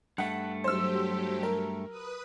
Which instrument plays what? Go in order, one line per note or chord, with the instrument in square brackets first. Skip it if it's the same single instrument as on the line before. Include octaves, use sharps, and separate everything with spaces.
[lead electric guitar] G2 A3 [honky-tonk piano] F#5
[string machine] F#3 G4 [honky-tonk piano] C5 E6
[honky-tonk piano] A#4
[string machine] B4 D#6